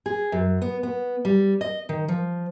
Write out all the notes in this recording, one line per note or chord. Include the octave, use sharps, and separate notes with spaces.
G#4
F#2
B3
B3
G3
D#5
D#3
F3